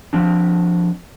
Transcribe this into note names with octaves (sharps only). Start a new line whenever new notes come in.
F3 C4 D4